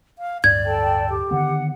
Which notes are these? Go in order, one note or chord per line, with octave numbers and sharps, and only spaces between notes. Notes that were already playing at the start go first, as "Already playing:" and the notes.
F5
D1 G2 D5 G#6
A4 G5 A5
G4
D3 D#3 B3 F#5